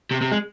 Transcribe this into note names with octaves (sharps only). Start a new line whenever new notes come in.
C3
C3
G#3